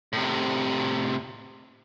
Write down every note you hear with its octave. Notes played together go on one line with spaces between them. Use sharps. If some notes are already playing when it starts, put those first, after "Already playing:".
A2 C3